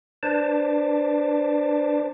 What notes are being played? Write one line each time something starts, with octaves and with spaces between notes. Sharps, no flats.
D4 B4 C5 D5 A5